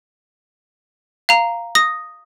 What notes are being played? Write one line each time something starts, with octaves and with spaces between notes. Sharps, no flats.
F5 A#5
D#6 A#6